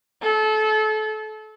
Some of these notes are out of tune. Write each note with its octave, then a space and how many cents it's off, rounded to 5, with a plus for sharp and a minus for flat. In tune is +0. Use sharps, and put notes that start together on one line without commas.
A4 -30